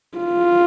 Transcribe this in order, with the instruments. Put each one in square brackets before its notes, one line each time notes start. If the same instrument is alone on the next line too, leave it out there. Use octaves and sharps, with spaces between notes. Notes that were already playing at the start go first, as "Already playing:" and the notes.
[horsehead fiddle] F4